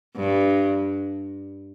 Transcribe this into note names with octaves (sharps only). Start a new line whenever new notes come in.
G2